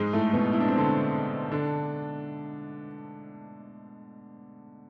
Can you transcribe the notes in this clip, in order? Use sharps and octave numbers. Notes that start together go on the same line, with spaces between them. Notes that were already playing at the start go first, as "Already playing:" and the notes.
Already playing: G#2 G#3
A2 A3
B2 B3
E4
D4
C4
D3 D4
D3 D4